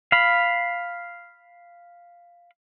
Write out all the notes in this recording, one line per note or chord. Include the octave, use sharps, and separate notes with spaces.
F5 B5